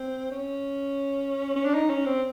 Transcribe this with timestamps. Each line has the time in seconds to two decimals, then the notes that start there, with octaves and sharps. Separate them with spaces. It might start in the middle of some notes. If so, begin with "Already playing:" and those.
Already playing: C4
0.32 C#4
1.56 C#4
1.65 D4
1.75 D#4
1.90 C#4
2.05 C4